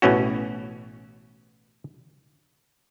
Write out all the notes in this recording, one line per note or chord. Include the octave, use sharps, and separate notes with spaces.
A1 B2 E3 C#4 F#4